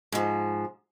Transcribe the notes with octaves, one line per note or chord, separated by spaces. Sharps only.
G#2 F3